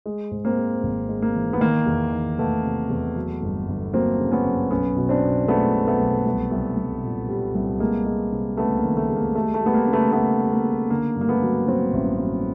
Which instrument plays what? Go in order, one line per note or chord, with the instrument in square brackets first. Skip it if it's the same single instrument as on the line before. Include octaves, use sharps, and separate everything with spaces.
[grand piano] G#3
G#2
A#3 C4
G#3
G#1
G#3
A#3
E3
B3
D#3 A#3
E2
D#3
E2 A3 B3
C3
E2
F#3
G1
G1
F#3 A#3 C4
C#3
B3 C#4
F#2
B1 B3 C#4
B2
C4 D4
B2
G#3 A3 B3
B2
A3 B3
B1
C2
C2
C2
A#2
G3
C2
G#3 A#3
G#3
C3
C#2 A3 B3
A#3
D#3
A3
G#3
A#3
G3 A3
A3
G3
B3
A#3
C#3
A3 B3
C#3 A3 B3
G3
A#3
C#3
D3 A#3
G2
A#3
A3 B3
F#3
F#3 A#3 C4
A1
F#3